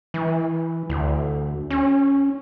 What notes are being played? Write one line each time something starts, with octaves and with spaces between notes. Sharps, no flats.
E3
D2
C#4